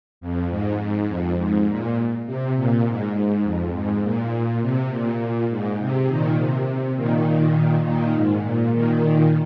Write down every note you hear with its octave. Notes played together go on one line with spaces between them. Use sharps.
F2
G#2
G#2
F2
G#2
A#2
C3
A#2
G#2
G#2
F2
G#2
A#2
C3
A#2
G#2
C3
A#2 D#3
C3
A#2 D#3
A#2 D#3
G#2
A#2
A#2 D#3